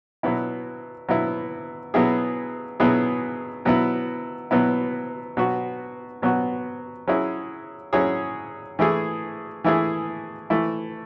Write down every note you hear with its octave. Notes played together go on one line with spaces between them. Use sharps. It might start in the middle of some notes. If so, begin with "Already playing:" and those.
B2 F#3 B3 E4
B2 F#3 B3 E4
B2 F#3 B3 E4 G#4
B2 F#3 B3 E4 G#4
B2 F#3 B3 E4
B2 F#3 B3 E4
B2 F#3 B3 F#4
B2 F#3 B3 F#4
F#3 C#4 E4 G#4
F#3 C#4 E4 G#4
E3 A3 E4 G#4
E3 A3 E4 G#4
E3 A3 E4